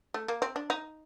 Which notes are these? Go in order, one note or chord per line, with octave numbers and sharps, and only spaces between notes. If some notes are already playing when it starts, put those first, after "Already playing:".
A3
A#3
C4
D4
D#4